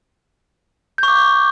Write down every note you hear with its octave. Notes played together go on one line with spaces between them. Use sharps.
C#6 D6 G6